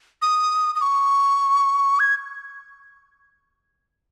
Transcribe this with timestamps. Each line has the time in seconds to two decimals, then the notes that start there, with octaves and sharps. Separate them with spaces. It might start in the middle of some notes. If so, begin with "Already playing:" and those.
0.22 D#6
0.75 D#6
0.81 C#6
1.99 G#6